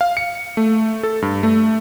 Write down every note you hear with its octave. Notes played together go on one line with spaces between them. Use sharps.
F5
C#7
A3
A4
G2
A3